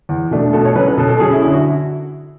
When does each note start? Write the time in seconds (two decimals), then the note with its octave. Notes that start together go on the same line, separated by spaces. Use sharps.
0.09 E2
0.31 B2 A3 D4
0.53 B2 A4
0.65 C#5
0.75 F#3 C#4 B4
0.88 B4
0.97 B2 A4
1.09 A4
1.20 F#3 C#4 G#4
1.31 E4
1.42 D3 E4
1.53 F#4